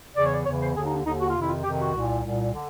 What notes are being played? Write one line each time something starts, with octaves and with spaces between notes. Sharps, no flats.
E2 C#3 E3 D5
C#5
D5
E2 C#3 E3 C#5
C5
D#2 D3 G#4
D#4
D4
D#2 D3 D#4
F#4
F4
F2 C3 D#3 E4
F4
F2 C3 D#3 G4
F#4
C2 A#2
C2 A#2
D3